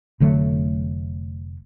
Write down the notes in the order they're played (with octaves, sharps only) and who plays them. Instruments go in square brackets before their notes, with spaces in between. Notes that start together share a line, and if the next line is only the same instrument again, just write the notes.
[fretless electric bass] F1 D3 F#3 A3